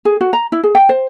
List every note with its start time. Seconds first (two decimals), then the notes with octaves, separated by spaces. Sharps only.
0.05 G#4
0.21 F#4
0.33 A#5
0.52 E4
0.64 G#4
0.75 G5
0.89 C5